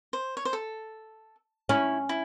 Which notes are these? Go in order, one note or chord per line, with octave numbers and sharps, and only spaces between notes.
C5
C#5
C5
A4
C#4 E4
E4